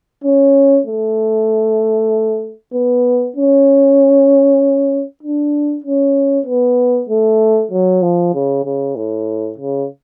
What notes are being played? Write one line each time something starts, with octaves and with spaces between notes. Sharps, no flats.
C#4
A3
B3
C#4
D4
C#4
B3
A3
F#3
F3
C#3
C#3
A2
C#3